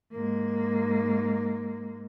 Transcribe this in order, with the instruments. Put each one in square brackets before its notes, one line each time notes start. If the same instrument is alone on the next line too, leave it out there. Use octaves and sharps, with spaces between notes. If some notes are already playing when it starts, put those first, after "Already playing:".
[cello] G#2 A#3